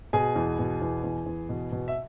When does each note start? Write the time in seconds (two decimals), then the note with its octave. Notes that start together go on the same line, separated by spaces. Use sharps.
0.13 B2 G#4 G#5
0.36 E2
0.59 B2
0.81 E2
1.04 E2
1.26 E2
1.49 B2
1.72 B2
1.88 E5